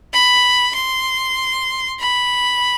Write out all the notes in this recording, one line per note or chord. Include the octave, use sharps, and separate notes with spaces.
B5
C6
B5